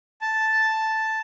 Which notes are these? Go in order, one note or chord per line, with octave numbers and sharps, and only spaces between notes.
A5